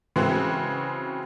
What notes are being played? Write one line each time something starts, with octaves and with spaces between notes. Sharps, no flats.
C#3 E3 G#3 C4 F#4 G#4